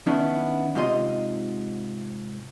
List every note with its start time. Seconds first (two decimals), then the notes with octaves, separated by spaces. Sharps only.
0.06 D#3 B3 C#4 D4 E4
0.75 G#2 C3 F4 D#5 C6